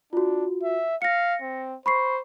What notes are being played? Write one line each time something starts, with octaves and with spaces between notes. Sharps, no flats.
D4 F4 F#4
E5
F5 A#6 C#7
C4
C5 B5 C#6 C7